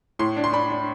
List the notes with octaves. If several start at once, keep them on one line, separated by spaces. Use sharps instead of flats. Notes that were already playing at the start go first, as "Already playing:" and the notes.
A2 C6
D4
C6
D4 B5
D4